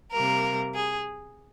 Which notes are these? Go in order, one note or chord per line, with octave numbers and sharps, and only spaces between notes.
C3 G3 A#3 A#4
G#4